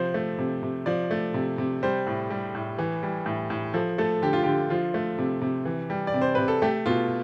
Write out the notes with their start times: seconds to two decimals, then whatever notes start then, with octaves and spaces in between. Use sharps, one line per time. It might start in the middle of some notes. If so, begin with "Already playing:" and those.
Already playing: C3 F3 C5
0.14 A3
0.38 C3
0.63 C3
0.86 F3 D5
1.11 A3
1.34 C3
1.58 C3
1.83 G3 C5
2.07 A2
2.30 G3
2.55 A2
2.79 E3
3.03 G3
3.26 A2
3.50 A2
3.74 F3 A4
3.98 A3 A4
4.22 D3 G4
4.33 F4
4.43 D3 G4
4.70 F3 F4
4.94 A3
5.18 C3
5.41 C3
5.65 E3
5.90 G3
6.07 D5
6.14 C3
6.21 C5
6.35 C3 B4
6.48 A4
6.62 A3 G4
6.86 B2 F4